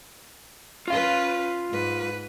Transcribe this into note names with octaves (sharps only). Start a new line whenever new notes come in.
C#4 F4 B4 F5
G#2 B4